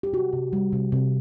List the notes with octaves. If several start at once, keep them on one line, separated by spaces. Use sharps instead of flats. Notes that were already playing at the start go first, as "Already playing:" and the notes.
G4
C3 F#4
C3
G3
C3
C3